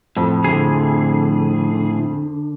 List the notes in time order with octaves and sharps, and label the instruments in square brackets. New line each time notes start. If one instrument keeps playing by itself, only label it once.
[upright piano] F2 [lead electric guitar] A2
[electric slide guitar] A2 G#4 [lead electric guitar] D3